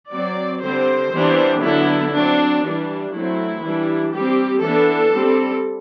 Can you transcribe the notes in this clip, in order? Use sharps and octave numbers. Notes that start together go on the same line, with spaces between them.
F#3 C4 D5
D3 G3 C4 C5
E3 G3 B3 D4
D3 F#3 B3 D4 E4
F#3 C4 D4
E3 G3 D4
F#3 A3 C4 E4
E3 G3 D4
G3 C4 G4
E3 B3 D4 A4
G3 C4